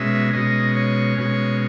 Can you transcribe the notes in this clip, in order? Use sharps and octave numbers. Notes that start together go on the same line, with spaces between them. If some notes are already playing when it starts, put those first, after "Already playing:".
Already playing: B2 G#3 C#4 E5
B2 G#3 C#4 D#5
C#5
B2 G#3 C#4 C#5